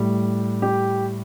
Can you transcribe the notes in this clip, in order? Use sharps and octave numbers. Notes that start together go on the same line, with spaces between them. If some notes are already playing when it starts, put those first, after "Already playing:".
Already playing: A2 G3
G4